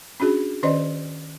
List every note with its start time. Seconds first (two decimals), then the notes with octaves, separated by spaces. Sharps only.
0.20 C#4 D4 F#4 G#4
0.63 D#3 C#4 C5 D5 D#5